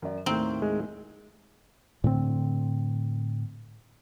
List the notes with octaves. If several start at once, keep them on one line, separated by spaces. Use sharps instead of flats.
F#2 D5
D#2 A2 C4 A#5
G#3
A2 D3 C4